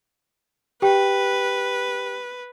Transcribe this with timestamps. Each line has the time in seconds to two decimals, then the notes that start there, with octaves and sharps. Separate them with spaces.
0.82 G4 B4 G5